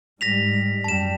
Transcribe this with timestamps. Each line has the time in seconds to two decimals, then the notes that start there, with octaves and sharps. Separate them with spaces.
0.21 G#2 G3 A#6 B6 F7
0.84 F#2 G3 A5 E7